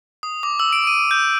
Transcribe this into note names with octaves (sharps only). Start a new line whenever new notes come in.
D#6
D6
E6
D7
D#7
G6